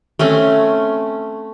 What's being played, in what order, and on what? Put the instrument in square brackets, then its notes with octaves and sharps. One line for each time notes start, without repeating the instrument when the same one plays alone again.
[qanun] A3 C4 C#4